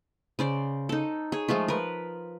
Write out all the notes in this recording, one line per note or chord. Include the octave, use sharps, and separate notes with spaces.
C#3 C5 D5
D#4 A4
G#4 C#5
F3 G#3 A3 F4
A#4 B4